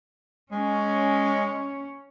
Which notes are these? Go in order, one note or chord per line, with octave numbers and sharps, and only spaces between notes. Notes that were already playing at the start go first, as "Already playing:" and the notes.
G#3 C#4